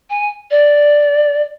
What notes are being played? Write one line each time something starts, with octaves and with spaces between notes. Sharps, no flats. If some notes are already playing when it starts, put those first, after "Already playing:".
G#5
D5